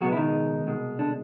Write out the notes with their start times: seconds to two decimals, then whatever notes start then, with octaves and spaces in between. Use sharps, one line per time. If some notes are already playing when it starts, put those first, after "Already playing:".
0.01 C#2 B2 F#3 G#3 B3 F#4
0.12 E4
0.17 D#3 D#4
0.67 C2 B2 G#3
0.99 D3 D4